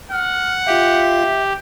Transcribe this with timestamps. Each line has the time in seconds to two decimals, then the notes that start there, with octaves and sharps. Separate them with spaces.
0.12 F#5 F6
0.67 F4 G4 E5 F5